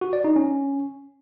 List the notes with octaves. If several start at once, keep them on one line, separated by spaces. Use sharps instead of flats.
F#4
D5
D#4
C#4